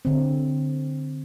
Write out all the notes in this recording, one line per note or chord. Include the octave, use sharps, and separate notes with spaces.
D3 C4